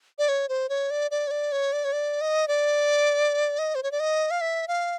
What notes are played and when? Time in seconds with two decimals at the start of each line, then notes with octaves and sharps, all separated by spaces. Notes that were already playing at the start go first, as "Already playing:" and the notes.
0.19 D5
0.29 C#5
0.49 C5
0.69 C#5
0.91 D5
1.11 D5
1.27 C#5
1.31 D5
1.52 C#5
1.73 D5
1.84 C#5
1.93 D5
2.21 D#5
2.48 D5
3.59 D#5
3.75 C5
3.83 C#5
3.92 D5
4.00 D#5
4.31 F5
4.41 E5
4.68 F5